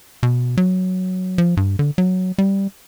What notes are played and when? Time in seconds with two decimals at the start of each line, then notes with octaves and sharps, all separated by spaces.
0.23 B2
0.57 F#3
1.38 F3
1.57 G2
1.79 D3
1.98 F#3
2.38 G3